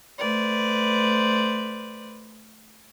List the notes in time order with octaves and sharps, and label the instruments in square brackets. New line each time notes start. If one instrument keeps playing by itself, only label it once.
[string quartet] A3 B4 C5 D5